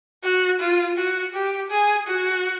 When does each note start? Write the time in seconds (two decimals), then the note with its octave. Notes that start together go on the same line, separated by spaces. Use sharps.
0.24 F#4
0.60 F4
0.97 F#4
1.34 G4
1.70 G#4
2.07 F#4